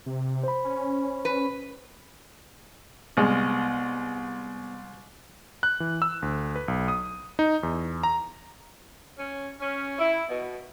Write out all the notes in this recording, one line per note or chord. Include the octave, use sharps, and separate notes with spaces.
C3
C5 B5
C#4
B4
C2 G#3 B3
F#6
E3
E6
D2
B4
B1
D#6
D#4
E2
A#5
C#4
C#4
E4
B2